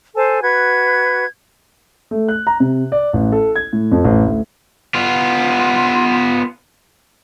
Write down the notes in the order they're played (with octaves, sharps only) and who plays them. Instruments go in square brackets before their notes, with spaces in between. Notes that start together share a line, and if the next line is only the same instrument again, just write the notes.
[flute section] A4 C5 G#5 A5
F#4 B4 G#6
[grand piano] A3
F#6
A#5
C3
D5
A1
A4
G#6
A2
F2
A1
D2
[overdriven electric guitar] B3 F4